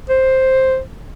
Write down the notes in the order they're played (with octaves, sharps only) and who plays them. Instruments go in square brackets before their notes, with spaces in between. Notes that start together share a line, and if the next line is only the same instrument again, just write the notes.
[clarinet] C5